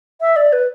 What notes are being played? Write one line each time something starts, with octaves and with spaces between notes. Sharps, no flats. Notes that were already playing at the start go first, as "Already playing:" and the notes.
E5
D5
B4